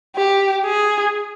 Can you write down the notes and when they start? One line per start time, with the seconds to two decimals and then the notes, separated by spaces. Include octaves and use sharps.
0.16 G4
0.66 G#4